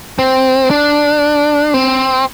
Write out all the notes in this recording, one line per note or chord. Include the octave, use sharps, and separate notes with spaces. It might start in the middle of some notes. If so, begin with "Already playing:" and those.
C4
D4
C4